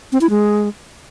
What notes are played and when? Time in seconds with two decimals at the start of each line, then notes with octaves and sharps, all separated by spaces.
0.12 C4
0.21 E4
0.30 G#3